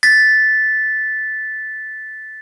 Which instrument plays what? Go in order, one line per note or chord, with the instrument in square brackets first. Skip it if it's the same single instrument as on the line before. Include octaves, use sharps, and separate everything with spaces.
[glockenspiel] A6 B6